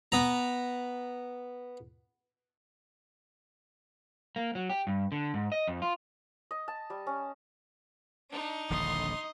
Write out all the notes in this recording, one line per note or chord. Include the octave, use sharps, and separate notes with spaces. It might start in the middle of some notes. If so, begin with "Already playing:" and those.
B3 A#5
A#3
F#3
G4
G2
D3
G#2
D#5
F2
F4
D#5
A5
G3
C#4
D4 D#4
D#1 A#1 D3 D#5 C6